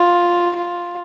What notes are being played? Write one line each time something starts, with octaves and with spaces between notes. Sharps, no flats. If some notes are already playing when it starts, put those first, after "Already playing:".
Already playing: F4
F4